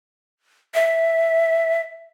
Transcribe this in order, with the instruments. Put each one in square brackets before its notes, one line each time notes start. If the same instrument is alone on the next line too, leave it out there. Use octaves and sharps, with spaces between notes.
[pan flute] E5